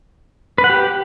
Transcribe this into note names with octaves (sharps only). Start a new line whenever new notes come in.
B4
F#5
G4